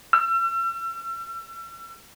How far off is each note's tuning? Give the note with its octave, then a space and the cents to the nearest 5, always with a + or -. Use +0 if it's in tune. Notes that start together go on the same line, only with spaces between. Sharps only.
E6 +40